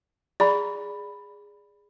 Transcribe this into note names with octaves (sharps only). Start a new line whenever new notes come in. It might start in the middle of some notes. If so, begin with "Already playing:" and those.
G#4 D5 B5